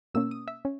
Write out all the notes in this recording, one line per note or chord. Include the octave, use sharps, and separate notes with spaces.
B2 A#3 C#4 E6
D#6
E5
C#4